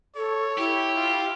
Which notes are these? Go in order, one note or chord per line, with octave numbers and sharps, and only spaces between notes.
A4 C#5
E4 G4
F4